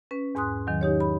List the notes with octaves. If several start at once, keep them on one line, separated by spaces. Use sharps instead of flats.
C#4 B4
E2 G#2 G#5 C6 D#6 F#6
E2 D#3 F#3
D#4 G4 C#5
B5